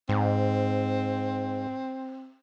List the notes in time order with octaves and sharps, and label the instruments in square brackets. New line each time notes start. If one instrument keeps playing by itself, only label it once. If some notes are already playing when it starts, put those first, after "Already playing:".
[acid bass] G#2 [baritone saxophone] C4